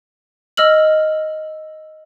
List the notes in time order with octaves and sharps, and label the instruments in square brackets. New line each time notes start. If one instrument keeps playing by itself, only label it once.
[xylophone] D#5 E6 F6 F#7